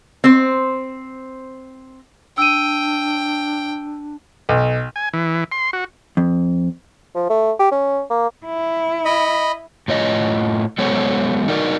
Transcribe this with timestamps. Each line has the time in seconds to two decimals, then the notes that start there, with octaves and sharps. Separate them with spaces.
0.24 C4 C5
2.38 D4 G5 E6 D#7
4.49 B1
4.96 G#5
5.13 E3
5.52 C6
5.73 F#4
6.17 F2
7.15 F3
7.30 A3
7.59 G4
7.71 C#4
8.10 A#3
8.46 E4
9.05 D#5 B5
9.88 A2 F4 C#5 D#5
10.78 F#3 G#3 B3 A4 C5 C#5
11.48 D#4 F#4 A#4 D5 D#5